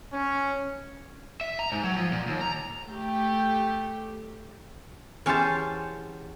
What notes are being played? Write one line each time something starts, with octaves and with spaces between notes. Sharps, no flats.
C#4
E5
A#5
G#2
F#3
F3
A#2
D#2
A#5
A3 G4
E2 C#4 G4 C5 A5